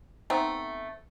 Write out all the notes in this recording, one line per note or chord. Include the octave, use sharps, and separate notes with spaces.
A3 B3 C4 D#4